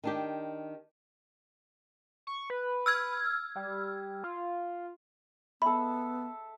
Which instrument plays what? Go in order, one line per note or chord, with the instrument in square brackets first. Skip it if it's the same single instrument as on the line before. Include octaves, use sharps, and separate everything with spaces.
[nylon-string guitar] D#3 D4 G4
[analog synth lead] C#6
B4
[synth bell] E6 F6 G#6
[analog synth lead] G3
F4
[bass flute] B3 [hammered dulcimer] A4 E5 [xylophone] B5